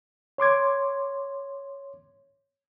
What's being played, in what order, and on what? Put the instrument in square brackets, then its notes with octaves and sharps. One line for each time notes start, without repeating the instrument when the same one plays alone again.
[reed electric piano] C#5 C6 D6 G#6